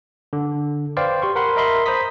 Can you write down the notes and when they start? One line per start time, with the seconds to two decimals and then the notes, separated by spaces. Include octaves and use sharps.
0.33 D3
0.97 B4 C5 D5 F5 G5
1.22 G4 C6 C#6
1.36 A#4 F#5 B5 C6
1.56 A#4 D#5 E5 B5 C6
1.86 C5 A#5 B5 D#6 B6